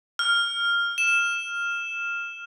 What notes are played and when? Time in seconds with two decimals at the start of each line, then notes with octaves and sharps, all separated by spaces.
0.19 F6
0.98 E7